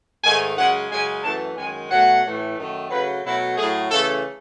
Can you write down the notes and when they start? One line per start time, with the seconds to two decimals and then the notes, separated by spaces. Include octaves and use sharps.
0.23 G#2 D#3 A3 G#5
0.57 F#2 C#3 G#3 F#5
0.90 F#2 C#3 G#3 G#5
1.23 F#2 E3 A3 A5
1.57 F#2 D#3 G#3 G#5
1.90 B2 F#3 A3 F#5
2.24 A2 E3 A3
2.57 F#2 D#3 A3
2.90 C#3 F#3 A3 B4
3.24 B2 F#3 A3 E4
3.57 A2 F#3 A3 G#4
3.90 C#3 E3 A3 A4